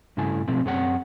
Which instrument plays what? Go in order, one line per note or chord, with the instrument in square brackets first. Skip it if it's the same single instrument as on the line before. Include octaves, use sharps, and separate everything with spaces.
[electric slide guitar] G2 C#3 A3 E4 A4 G#5
B2 F3 F#3 A3 C4
F#2 C4 G#4 C#5 F#5